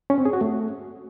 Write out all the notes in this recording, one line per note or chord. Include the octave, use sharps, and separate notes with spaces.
C#4
C4
G#4
F#4
A3